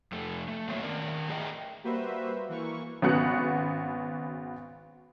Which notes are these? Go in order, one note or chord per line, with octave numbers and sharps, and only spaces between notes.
F2 A3
A3
F#3 A#3 C4 F#4 C#5 E5
D#3 A#4 D5
A2 G#4 A#4 D#5 E5 G5
G3 A#3 F#4 B4 C5 E5
E3 A#3 C#6
G#1 C#3 B3 F#4 F#6 C#7